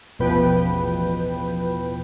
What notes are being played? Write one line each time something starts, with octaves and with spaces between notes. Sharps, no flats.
A1 E2 B2 F3 B4 G5